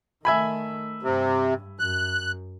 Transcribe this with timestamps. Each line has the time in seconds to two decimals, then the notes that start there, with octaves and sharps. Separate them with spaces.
0.25 D#3 A3 E5 G#5 B5
1.03 G2 C3
1.79 F#2 F#6